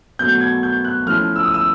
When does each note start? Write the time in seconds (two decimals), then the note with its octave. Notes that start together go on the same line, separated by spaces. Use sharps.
0.19 B2 F#3 A3 G6
0.41 G#6
0.63 G6
0.85 F#6
1.06 F3 A3 C#4 E4 F6
1.36 E6
1.45 D#6
1.54 E6